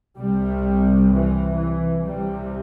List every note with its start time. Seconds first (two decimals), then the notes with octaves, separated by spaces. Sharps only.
0.16 C2 C3 G3
1.11 E3
1.58 E3
2.05 C2 C3 G3